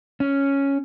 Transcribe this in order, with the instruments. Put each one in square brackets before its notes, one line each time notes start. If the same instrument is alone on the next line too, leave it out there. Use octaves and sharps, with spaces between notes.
[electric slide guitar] C#4